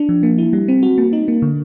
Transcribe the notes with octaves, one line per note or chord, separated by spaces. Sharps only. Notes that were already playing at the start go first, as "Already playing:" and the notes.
Already playing: D4
F3
A#3
E4
G3
C4
F#4
A#3
D#4
A#3
D3